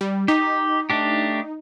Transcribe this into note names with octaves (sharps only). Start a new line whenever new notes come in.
G3
D#4 G4
A3 D4 G4